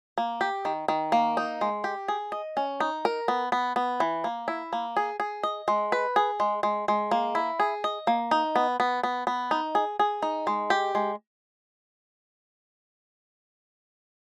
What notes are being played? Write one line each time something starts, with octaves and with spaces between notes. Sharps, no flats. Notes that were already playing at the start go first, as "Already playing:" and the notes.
A#3
G4
D#3
D#3
A#3
D#4
G#3
G4
G#4
D#5
C#4
D#4
A#4
B3
B3
B3
E3
A#3
E4
A#3
G#4
G#4
D#5
G#3
B4
G#4
G#3
G#3
G#3
A#3
E4
G#4
D#5
A#3
D#4
B3
B3
B3
B3
D#4
G#4
G#4
D#4
G#3
G4
G#3